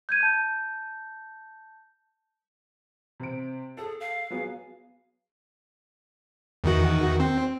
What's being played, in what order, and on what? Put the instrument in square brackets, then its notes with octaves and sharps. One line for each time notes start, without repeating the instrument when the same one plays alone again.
[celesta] G6 G#6 D#7
A5 G6
[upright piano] C3 C5 D7
[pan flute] G#4 [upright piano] A4
[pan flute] F5
[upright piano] F#3 B3 G#4
[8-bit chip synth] E2 D#3 F#4
C4